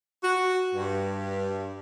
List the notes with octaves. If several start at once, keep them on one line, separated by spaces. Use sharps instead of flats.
F#4
G2